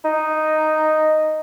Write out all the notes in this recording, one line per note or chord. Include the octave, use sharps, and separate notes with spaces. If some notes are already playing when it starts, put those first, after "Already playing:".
D#4